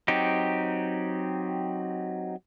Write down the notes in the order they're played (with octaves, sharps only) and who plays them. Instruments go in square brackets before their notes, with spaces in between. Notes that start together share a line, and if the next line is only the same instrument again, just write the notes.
[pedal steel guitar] F#3 C4 D#4 G4